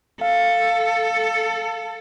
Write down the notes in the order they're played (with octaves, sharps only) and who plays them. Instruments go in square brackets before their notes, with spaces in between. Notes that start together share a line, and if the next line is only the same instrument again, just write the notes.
[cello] A4 [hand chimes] F5